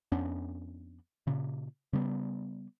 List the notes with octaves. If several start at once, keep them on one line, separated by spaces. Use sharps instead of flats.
F2 B3 C#4 D4
A#2 C#3
C#3 G3 B3